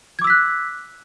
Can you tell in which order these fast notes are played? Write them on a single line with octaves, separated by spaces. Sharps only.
G#6 D6 E6 B6 F#6